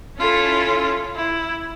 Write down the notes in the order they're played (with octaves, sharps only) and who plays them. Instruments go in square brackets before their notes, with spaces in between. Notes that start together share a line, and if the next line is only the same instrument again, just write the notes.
[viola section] C#4 E4 A4 [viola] F4
[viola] E4